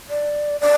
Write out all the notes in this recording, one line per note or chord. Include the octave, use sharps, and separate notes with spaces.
D5
D5